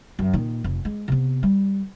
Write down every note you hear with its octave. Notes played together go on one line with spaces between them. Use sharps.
F#2
A#2 D#3
F1
G#3
C3 B3
G3